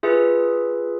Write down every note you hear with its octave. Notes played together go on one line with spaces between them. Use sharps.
F4 G#4 B4 E5